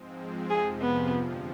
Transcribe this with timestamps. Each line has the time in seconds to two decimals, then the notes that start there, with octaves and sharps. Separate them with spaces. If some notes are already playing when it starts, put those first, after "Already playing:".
Already playing: G#2 F3 G#3 C4
0.49 F2 C3 F3 G#4
0.81 B3
1.13 G2 D3 F3